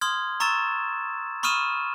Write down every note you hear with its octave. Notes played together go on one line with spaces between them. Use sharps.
C6 D#6 F6 G#6
A#5 C#6 E6 A6 E7
B5 C#6 D#6 F6 D#7 E7